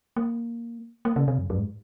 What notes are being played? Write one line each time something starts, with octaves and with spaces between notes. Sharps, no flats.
A#3
A#3
C#3
C3
F#2
F#2
G#2